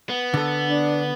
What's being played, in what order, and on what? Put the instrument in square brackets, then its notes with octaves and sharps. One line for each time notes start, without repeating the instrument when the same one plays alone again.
[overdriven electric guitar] B3
[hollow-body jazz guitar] D3 A4
[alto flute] D4